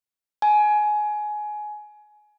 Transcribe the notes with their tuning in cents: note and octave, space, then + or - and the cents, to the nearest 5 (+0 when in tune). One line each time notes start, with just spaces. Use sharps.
G#5 +20